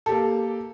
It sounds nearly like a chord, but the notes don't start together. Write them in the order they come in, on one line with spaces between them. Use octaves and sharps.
A4 G4 A#3